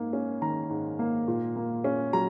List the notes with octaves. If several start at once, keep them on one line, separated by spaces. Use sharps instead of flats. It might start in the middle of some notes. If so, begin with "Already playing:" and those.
Already playing: G#2 A#3
C#4
D#3 A#5
G#2
A#3
A#2
A#3
C#4
F#3 A#5